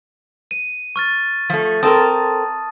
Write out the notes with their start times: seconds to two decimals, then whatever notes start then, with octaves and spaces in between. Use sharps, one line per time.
0.51 D#7
0.96 C#6 F6 A6
1.50 F3 A3
1.83 C4 A4 A#4 A5 D#6